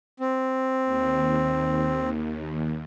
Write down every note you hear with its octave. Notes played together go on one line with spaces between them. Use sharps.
C4
D#2